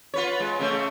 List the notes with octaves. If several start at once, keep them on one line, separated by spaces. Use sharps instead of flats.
F4 B4 C#5
G#3
C#3 A3